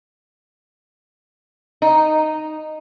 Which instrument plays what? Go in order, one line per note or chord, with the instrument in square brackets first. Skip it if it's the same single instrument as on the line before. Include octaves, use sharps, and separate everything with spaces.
[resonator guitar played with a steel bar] D#4